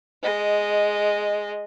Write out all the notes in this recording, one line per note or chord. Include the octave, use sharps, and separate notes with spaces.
G#3 D#5